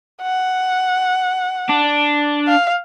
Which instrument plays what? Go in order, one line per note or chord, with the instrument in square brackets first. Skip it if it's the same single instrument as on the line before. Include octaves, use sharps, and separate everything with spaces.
[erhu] F#5
[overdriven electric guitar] D4
[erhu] F5